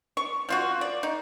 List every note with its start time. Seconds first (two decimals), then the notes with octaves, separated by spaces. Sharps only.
0.17 C#6
0.49 F3 F4 F#4
0.81 D5
1.03 D#4